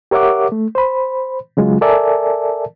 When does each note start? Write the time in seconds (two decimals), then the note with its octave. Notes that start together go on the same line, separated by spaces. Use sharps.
0.11 G4 A#4 C#5 E5 F#5 D6
0.52 A3
0.75 C5 B5
1.57 C#3 F#3 G#3 F4
1.81 A4 A#4 D5 E5 G#5 A5